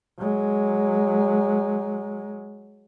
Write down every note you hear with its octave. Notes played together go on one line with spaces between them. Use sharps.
F#3 G#3